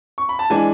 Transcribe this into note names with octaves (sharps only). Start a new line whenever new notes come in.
C#6
B5
A5
E3 G#3 D4 G#5